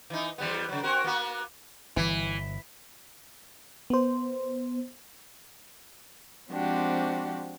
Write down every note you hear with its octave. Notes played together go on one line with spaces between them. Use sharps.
E3 D#4
E2 G3 B3
C#3 F#3
C4 F#4 A#4
A#3 B3 F#4
G1 B2 E3
B3 C5
F3 G#3 C4 D4 F#4 G4